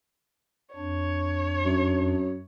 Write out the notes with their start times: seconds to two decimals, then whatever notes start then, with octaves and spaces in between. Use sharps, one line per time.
0.76 F2 D4 C#5
1.65 F#2